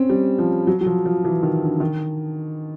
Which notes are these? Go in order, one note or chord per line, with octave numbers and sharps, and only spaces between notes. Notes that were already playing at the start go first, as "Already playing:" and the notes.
Already playing: C4 C#4
G3
F3
F#3
F#3
F3
F3
E3
D#3
D3
D#3